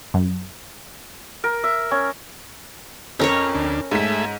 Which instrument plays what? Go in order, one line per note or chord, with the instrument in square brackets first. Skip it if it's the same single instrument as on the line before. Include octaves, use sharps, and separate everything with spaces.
[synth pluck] F#2
[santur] A#4
E5
C#4
[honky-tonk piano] F2 [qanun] C#4 A#4 C#5
[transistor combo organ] D2 D4
[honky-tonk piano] G#2 B6 [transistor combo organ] A3 G#4 E5